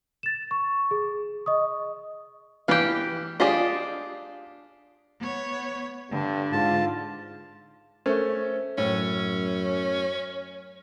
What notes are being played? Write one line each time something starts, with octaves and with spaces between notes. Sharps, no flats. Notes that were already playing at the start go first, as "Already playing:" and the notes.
A6 E7
C#6
G#4
D#5 C#6 D#6
E3 G4 B4 F5
D4 F4 G4 G#4 D#5
B3 C#5
G2 D3
G#2 F4 A5
A3 C#4 A4 A#4 C5
F#2 A2 C#4